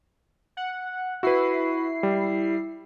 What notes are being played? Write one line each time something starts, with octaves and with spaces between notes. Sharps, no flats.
F#5
E4 F#4 B4 C7
G3